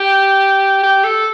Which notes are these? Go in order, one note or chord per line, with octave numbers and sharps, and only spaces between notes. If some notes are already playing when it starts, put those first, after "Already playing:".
Already playing: G4
G4
A4